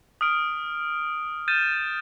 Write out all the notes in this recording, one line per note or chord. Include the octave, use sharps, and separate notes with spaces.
D#6 F6 D7
F6 G6 A6 D#7 E7